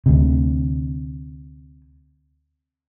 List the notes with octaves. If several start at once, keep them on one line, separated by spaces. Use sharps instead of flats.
D2 C3